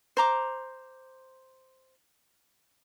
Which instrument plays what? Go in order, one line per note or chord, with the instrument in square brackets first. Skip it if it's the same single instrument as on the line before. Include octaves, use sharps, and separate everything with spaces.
[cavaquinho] C5 A#5 D6